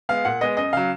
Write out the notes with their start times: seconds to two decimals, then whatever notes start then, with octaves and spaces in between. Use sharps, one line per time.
0.09 G#3 B3 F5
0.25 A#2 F#5
0.41 G#3 B3 D#5
0.57 F#2 D#5
0.73 C#3 F#3 F5